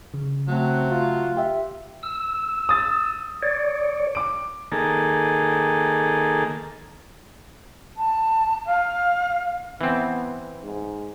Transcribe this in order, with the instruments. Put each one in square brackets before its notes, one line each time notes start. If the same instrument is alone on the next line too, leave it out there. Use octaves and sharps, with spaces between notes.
[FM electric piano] C#3
[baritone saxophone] F#3 [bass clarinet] A3 [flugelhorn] C4
[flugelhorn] F4
[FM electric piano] G4 E5
[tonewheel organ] E6
[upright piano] D#6 A6
[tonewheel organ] C#5 D5
[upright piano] D6 D7
[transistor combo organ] D#3 A#3 G#4 A4
[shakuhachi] A5
F5
[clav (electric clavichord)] E3 C4 [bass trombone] B3
[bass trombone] G#2